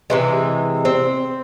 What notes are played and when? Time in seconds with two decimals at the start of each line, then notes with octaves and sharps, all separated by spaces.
0.10 C3 E3 G#3
0.85 C4